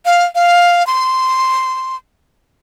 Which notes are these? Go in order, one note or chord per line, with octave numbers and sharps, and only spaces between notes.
F5
F5
C6